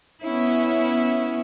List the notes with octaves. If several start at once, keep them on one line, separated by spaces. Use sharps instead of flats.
B3 C#4 E4